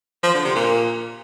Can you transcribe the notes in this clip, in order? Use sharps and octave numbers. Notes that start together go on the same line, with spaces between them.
F3
D3
C3
A#2